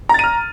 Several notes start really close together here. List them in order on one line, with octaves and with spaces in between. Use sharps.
A#5 A6 D#7 F6